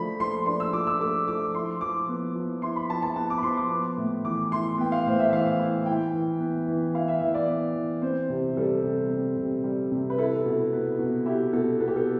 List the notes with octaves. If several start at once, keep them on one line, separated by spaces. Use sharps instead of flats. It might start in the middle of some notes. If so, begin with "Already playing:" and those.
Already playing: F3 A3 D4 B5
F3 C6
D4 C6
E6
F3 D6
E6
A3 D6
F3 D6
E4 C6
F3 D6
B3
F3
E4 C6
B5
F3 A5
A5
B3 A5
D6
B5
F3 C6
D6
B3
A2
E3 D6
E4 C6
B3 G5
F5
A2 C5
E5
E3 F5
E4
E4 G5
E3
B3
E3
E4 F5
E5
E3 E5
D5
B3
E3
C4 C5
C3
G3 A4
C3
C4
C3
G3
C3
B4
E4 A4
B2
B3
B2
E4 G4
B2 A4
B3 A4
G4
A4